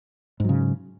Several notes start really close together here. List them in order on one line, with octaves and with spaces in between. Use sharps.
G#2 F#3 C#3